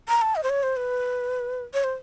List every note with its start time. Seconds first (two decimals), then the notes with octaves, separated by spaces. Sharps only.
0.08 A#5
0.22 A5
0.36 D#5
0.43 C5
0.50 C#5
0.63 C5
0.77 B4
1.74 C#5
1.84 C5